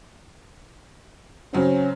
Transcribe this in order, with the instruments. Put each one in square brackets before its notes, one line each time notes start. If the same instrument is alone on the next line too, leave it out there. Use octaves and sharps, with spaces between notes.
[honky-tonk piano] C#3 F#3 C4 [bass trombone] C#4